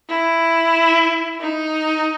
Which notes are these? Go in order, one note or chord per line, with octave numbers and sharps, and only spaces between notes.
E4
D#4